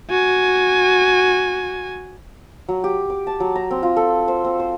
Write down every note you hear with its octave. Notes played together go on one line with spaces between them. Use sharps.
F#4 G#5
F#3
G4
D6
A5
F#3
A#5
C4
F4
A4
C5
C4
C5